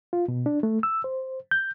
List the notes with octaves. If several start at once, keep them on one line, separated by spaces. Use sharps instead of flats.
F4
B2
D4
A3
E6
C5
G6